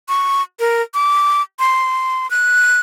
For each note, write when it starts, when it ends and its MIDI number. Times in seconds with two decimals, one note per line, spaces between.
0.09 0.42 85
0.60 0.82 70
0.94 1.42 86
1.59 2.30 84
2.31 2.81 90